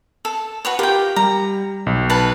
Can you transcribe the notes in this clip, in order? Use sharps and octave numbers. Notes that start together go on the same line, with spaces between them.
A4
F#4 B4 C#5
F4 G4 A#4 G5
G3 A#5
B1
B4 A5